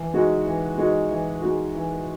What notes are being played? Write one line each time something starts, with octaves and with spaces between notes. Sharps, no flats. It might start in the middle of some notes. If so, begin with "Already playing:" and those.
Already playing: E3
G#3 D#4 F#4
E3
G#3 D#4 F#4
E3
G#3 D#4 F#4
E3